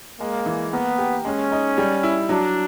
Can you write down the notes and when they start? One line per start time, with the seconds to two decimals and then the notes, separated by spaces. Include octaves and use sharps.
0.20 G#3 A#3
0.46 E3
0.72 A#3 B3
0.98 G4
1.25 G#3 C#4
1.52 D#4
1.78 G3
2.03 E4
2.29 F#3 D4